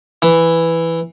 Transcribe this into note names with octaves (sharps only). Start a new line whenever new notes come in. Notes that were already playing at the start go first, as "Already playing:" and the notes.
E3